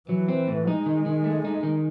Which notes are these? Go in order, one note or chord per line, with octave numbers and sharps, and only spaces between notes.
E3 F#3
C4
A2
G#3 D#4
D#3
D#3
A3
D#4
D#3